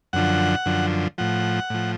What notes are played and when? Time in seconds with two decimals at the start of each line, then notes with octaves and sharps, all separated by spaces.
0.13 F#2 D3 F3 F#5
0.66 F#2 D3 F3
1.18 A2 F3 F#5
1.70 A2 F3